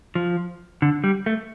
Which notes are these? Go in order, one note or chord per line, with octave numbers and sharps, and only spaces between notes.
F3
D3
G3
A3